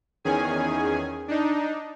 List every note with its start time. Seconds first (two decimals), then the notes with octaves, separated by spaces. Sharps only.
0.24 E2 D#3 C#4 G#4 G#5
1.28 D4 D#4